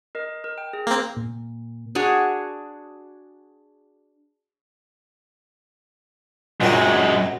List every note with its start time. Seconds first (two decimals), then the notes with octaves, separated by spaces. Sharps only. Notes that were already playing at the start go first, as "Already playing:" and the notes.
0.15 A#4 D#5
0.44 A#4
0.58 G5
0.73 G#4
0.87 A#3 C4
1.16 A#2
1.95 D4 F#4 G#4 C#5
6.61 F#2 A#2 F#3 G#3 C4